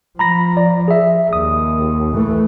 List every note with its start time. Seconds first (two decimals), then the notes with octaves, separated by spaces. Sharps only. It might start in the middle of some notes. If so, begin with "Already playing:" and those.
0.19 F3 A#5 B5 A#6
0.57 D5
0.88 G#4 E5
1.33 D#2 D#6
2.15 E3 A3